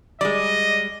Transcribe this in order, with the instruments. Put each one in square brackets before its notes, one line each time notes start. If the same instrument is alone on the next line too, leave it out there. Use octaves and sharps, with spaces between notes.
[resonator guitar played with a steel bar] G3 G#3 [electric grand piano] D5 [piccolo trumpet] D#5